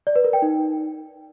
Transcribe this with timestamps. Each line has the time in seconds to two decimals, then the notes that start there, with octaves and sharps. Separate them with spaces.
0.07 D5
0.16 B4
0.24 A#4
0.33 G5
0.42 D#4